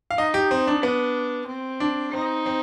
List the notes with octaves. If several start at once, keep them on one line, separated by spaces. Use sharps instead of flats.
F5
D#4 D#5
G4
C4
D4
B3 D4
C4
D4
C4 D#4
C4